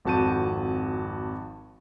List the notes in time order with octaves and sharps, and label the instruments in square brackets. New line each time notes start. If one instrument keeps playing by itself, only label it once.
[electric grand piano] G#1 F2 F#4 A5 G6 D#7